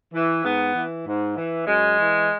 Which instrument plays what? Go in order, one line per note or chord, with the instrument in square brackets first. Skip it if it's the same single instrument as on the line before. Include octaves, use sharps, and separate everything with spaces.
[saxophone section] E3
G#2 B3
E3
G#2
E3
F#2 G#3
E3